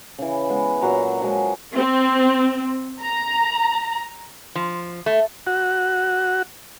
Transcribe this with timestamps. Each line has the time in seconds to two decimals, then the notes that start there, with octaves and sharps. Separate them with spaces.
0.18 C#3 E3
0.49 G#3 B3
0.81 A#2 F#3 F#5 A#5
1.20 F3 F#3 G#3
1.76 C4
3.02 A#5
4.55 F3
5.06 A3
5.47 F#4